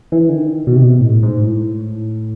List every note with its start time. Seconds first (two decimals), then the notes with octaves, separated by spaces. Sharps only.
0.12 E3
0.29 D3
0.34 D#3
0.67 B2
0.76 C3
0.83 B2
1.00 A2
1.23 G#2
1.45 A2